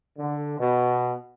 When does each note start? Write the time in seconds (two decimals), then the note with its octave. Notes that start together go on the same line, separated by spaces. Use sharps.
0.18 D3
0.58 B2